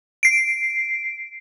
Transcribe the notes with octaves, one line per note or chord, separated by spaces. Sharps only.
C7 D7